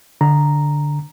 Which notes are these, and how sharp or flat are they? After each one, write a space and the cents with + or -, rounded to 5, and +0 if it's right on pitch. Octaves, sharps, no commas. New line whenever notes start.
D3 +0 D4 +0 A#5 +0